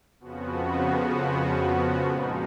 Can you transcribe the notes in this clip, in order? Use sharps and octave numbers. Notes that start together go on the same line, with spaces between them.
F2 C#3 F3 B3 F#4
A#2 F3 G#3 D#4